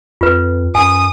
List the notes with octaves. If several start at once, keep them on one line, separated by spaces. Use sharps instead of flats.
F2 F4 B4
F#2 G#5 D#6